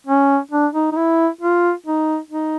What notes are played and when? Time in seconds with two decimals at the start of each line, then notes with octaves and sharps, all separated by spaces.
0.07 C#4
0.51 D4
0.74 D#4
0.92 D#4
0.96 E4
1.41 F4
1.86 D#4
2.30 D#4